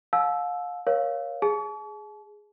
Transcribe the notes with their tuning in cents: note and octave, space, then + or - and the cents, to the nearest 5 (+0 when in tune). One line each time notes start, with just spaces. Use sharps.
F5 +35 A5 -40 E6 +0
A#4 +30 C#5 +0 F5 +0
G#4 +0 A5 -45